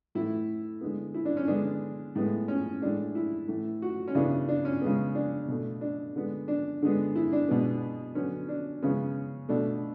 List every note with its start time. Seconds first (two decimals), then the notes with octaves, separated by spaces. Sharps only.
0.15 A2 E3 A3 E4
0.81 D3 G#3 B3
1.14 E4
1.25 D4
1.37 C#4
1.48 D3 G#3 B3 D4
2.15 A2 G#3 B3
2.48 C#4
2.82 A2 E3 G#3 D4
3.15 E4
3.48 A2 E3 A3
3.82 F#4
4.08 C#4
4.15 C#3 E3 B3 D4
4.49 D4
4.65 C#4
4.82 C#3 G#3 B3
5.15 D4
5.48 B2 A3
5.81 D4
6.16 D3 G#3 B3
6.48 D4
6.82 D3 G#3 B3
7.15 E4
7.32 D4
7.48 B2 G#3 B3
8.15 D3 F#3 B3 C#4
8.49 D4
8.82 C#3 G#3 B3 C#4
9.49 B2 A3 D4